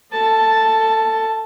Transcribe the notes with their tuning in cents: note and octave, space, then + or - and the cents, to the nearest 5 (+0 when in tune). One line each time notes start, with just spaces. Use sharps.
A4 +25 A5 +0